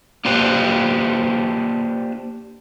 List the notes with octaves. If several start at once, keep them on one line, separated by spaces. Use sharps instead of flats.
A#3 D4 F4 G4 B4 C5